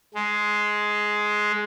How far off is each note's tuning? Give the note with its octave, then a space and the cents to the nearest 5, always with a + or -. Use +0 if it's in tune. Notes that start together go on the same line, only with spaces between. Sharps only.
G#3 +10